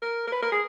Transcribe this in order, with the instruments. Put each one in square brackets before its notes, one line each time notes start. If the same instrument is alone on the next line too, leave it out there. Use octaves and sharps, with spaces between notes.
[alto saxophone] A#4
A#4
B4
A#4
G#4